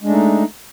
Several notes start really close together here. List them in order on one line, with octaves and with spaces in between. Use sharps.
G#3 D4 A3 D#4